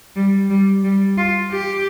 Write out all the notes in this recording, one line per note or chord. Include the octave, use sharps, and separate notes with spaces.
G3
G3
G3
F4
G4